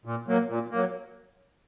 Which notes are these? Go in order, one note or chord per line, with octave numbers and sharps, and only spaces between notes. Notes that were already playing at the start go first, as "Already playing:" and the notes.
A#2
F#3 A#3
A#2
F#3 A#3